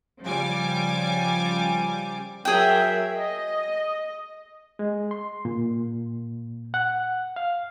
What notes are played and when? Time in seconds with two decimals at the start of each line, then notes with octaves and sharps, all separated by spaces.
0.23 C#3 F3 G3 G#5 D6
2.45 F#3 G#4 A#4 E5 G5
3.17 D#5
4.79 G#3
5.11 C6
5.45 A#2
6.74 F#5
7.36 F5